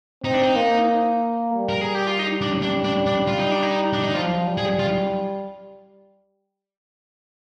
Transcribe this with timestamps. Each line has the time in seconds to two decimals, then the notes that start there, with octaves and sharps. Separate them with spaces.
0.24 C4 D#4
0.34 D4
0.43 D#4
0.56 A#3
1.54 G3
1.69 A#4
1.81 G#4
1.95 G4
2.07 F4
2.19 D#4
2.41 D4
2.62 D4
2.84 D4
3.06 D4
3.27 F4
3.39 D#4
3.51 D4
3.62 D#4
3.93 D4
4.03 D#4
4.14 F3 F4
4.47 G3
4.58 G#4
4.79 F4